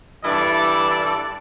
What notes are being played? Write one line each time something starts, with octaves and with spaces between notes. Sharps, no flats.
G2 E3 E4 A4 D5